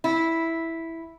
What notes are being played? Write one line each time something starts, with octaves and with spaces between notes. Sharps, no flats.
E4